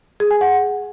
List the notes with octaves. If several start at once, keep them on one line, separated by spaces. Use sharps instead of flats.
G#4
G#5
F#5